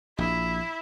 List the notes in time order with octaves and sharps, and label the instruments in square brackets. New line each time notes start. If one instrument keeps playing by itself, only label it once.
[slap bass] A#1 [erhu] E4